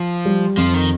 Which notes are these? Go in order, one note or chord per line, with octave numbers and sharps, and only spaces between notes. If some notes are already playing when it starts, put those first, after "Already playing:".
Already playing: F3
G3
F2 F3
D#3